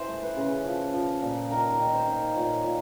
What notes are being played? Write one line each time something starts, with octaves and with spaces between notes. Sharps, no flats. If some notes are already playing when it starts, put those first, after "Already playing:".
Already playing: E3 C5
A3
B4
C#3
F3
F3
A#2
D#3 A#4
D#3
C5
D#3
A#2 C#5
A#2